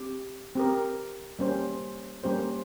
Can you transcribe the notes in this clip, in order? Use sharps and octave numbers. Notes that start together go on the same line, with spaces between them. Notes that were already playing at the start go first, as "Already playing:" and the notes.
Already playing: C4 G4
C4 G4 A#4
G3 A#3 C#4 G4 C5
G3 A#3 C#4 G4 C5